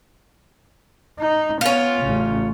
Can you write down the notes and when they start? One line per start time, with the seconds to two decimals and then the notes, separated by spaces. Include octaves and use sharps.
1.19 D#4
1.61 B3 C#4 F4
2.02 A1 C#3